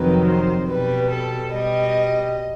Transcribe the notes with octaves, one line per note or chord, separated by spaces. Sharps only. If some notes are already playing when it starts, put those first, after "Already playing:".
Already playing: F2 C3 D#3 F#3 B4
C5
B2 G3 B4
A4
B2 G3 D#5